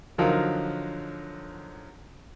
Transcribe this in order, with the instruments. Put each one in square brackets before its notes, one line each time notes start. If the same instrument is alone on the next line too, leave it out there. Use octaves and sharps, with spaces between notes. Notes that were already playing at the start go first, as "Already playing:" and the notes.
[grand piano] D3 F3 F#3 D#4 F4 A#4